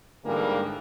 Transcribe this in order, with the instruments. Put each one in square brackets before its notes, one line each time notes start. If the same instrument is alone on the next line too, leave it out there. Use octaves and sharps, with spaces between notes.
[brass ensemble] G#2 D3 E3 F3 G3 A#3